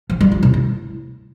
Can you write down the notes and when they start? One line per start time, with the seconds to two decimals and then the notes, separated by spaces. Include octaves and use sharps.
0.10 F3
0.21 G3
0.32 F4
0.43 C3
0.54 E4